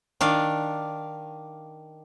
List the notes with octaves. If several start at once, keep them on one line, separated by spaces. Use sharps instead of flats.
D#3 D4 F5